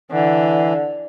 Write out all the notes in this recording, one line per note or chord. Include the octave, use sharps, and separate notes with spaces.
D3 E3